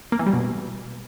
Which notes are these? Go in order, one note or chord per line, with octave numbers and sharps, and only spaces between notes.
A#3
E3
G3
B2